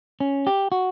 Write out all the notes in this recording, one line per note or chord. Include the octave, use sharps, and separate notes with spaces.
C#4
G4
F#4